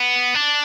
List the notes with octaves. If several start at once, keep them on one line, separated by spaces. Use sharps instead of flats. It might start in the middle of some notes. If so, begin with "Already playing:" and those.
Already playing: B3
D4